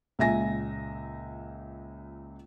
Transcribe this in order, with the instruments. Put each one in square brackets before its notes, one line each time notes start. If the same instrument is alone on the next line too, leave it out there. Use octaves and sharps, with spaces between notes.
[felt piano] C#2 A#2 E5 G#5 A#6